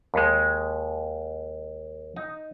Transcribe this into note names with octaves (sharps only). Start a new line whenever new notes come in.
D#2 G#3
D#4